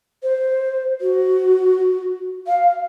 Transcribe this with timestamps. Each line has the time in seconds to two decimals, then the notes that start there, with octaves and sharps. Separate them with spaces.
0.23 C5
1.01 F#4
2.47 F5